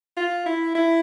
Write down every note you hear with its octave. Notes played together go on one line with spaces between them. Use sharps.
F4
E4
E4